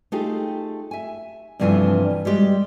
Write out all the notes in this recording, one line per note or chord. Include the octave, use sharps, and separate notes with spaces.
A3 D#4 F4 G4 G#4
E5 G#5
G2 C3 E3 F3 A3 G#5
G3 G#3 G4 D5